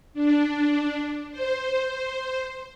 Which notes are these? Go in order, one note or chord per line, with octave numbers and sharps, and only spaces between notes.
D4
C5